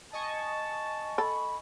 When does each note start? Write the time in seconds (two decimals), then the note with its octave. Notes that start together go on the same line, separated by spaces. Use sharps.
0.13 D#5 G#5 A5 C#6
1.18 A4 B5